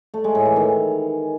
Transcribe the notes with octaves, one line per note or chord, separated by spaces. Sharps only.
A3
G#3
A2
E3
D#3